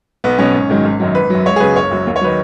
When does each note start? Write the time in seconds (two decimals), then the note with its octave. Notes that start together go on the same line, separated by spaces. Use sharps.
0.24 B1 B3
0.38 B2 F#3 C#4
0.54 G#1
0.70 G#2 D#3 F#3
0.85 G#1
1.00 F#2 D#3 F#3
1.15 G#1 B4
1.30 F#2 F#3
1.46 C#2 C#5
1.56 G#4
1.60 C#3 F#3 B4
1.76 F#1 C#5
1.91 F#2 F#3
2.07 D#2
2.16 C#5
2.21 D#3 F#3 B4